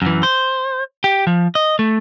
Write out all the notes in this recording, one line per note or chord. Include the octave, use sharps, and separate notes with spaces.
F#2 E3
C5
G4
F3
D#5
A3